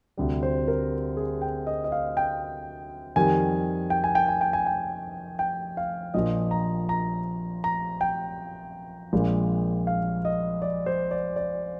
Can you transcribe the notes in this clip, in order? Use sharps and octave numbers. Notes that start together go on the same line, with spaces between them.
D2 C3 G3
C5
A#4
G#4
G5
D#5
D#5
F5
G5
F2 D#3 G3 G#5
G5
G#5
G5
G#5
G5
G#5
G5
G5
F5
A#1 A#2 F3 D#5
A#5
A#5
A#5
G5
A#1 A#2 G#3
F5
D#5
D5
C5
D5
D5